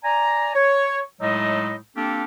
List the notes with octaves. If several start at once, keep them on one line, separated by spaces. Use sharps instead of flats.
D5 G#5 A#5
C#5
A2 F#3 G#3 A3 D#4 D#5
A#3 C4 D4 F4 G4 A4